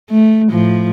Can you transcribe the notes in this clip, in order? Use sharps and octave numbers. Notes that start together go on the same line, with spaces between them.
A3
A2 F3